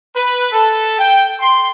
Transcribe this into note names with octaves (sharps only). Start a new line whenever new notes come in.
B4
A4
G5
C6